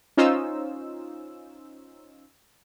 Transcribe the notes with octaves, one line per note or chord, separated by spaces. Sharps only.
C#4 D#4 F4 C5 E6